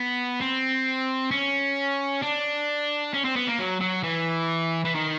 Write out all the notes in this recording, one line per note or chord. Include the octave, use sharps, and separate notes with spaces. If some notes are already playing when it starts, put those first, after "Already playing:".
Already playing: B3
C4
C#4
D4
C#4
C4
B3
A#3
F#3
F#3
E3
E3
D#3